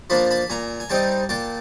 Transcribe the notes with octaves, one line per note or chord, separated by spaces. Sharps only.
F3 A#3 D4 A5 B5
A5 B5
A#2 G#5 A#5
G#5
G3 C4 D#4 G5 A5
A#2 G5 A5